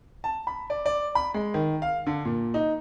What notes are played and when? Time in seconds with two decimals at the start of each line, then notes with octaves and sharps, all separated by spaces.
0.24 A5
0.47 B5
0.70 D5
0.86 D5
1.15 B5
1.34 G#3
1.54 D#3
1.82 F5
2.07 D3
2.25 A#2
2.54 D#4